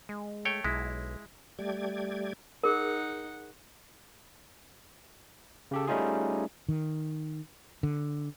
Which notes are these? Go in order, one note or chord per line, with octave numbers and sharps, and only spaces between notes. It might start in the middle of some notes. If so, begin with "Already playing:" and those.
G#3
A3 C#5 G5
B1 G#3 E4
G3 A3 G4 D5 G#6
D#4 G#4 A#4 F#5
C#3 G4 A4
G3 A3 C#4 D#4 F4 G#4
D#3
D3